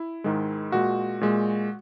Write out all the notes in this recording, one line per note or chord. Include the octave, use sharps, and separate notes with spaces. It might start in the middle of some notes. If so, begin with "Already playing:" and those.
Already playing: E4
G#2 D#3 G#3
A#2 G#3 F#4
A#2 G#3